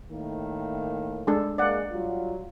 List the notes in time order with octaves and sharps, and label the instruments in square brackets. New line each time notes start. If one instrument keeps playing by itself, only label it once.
[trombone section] A2 D#3 A#3
[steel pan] G#3 D4 A4
[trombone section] G#3 A#3 [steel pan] D5 F#5
[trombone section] F#3 G3 F4